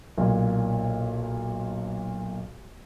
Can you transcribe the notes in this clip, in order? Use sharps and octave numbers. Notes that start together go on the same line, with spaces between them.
B1 A#2